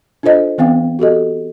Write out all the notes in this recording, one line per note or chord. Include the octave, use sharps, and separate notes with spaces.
D4 F4 A4 C5 D#5
E3 B3 C4 F5 G5
F#4 G4 A4 D#5